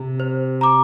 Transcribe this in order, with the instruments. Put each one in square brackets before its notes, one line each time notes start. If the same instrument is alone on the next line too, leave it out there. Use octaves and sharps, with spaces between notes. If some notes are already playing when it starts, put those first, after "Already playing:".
Already playing: [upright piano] C3
[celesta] C5
A#5 D6